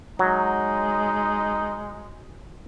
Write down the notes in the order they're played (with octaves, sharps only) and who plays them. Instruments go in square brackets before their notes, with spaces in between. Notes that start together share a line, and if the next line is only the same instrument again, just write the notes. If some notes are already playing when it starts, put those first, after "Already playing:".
[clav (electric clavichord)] F#3 [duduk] G#3 [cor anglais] D#4